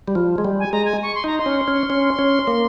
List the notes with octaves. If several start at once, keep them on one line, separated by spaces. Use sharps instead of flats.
G3
F3
G#3
G3
G#5
G#3 A#5
G#5
C#6
C6
D#4 A#5
C6
C#4
C#4
C#4
C#4
A#3